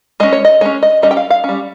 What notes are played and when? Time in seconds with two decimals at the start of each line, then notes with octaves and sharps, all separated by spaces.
0.20 G#3 C#4 D#5
0.32 C#5
0.45 D#5
0.61 G#3 C#4 C#5
0.83 D#5
1.02 G3 C#4 D#5
1.11 G5
1.17 F5
1.30 F5
1.44 G3 C#4